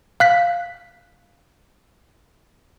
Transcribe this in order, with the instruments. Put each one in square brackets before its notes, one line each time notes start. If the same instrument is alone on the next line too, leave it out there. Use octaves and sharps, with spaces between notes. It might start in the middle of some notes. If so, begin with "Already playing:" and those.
[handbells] F5 F#6 B6